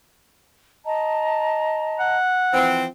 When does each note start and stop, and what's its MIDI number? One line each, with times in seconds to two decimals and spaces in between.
0.85 2.16 75
0.85 2.16 81
0.85 2.16 82
2.00 2.86 78
2.54 2.86 52
2.54 2.86 53
2.54 2.86 60